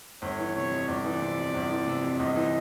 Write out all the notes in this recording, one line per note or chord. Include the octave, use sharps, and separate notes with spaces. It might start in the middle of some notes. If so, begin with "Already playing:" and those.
G1 C#5
E3
C3 C#5
F2
G1 D5
E3
C3
F2
G1
E3
C3
F2
G1 D#5
E3